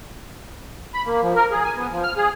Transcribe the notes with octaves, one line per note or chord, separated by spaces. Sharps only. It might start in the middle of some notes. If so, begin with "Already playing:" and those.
B5
A#3
F3
A#4
G#4
G#5
B3
F3
F6
G#4